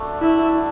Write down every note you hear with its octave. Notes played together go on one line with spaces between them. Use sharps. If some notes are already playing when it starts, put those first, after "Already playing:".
Already playing: A3 D4 F#4 A4
E4